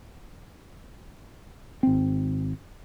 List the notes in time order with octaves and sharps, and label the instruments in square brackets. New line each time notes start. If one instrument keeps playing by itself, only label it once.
[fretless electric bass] G#1 C4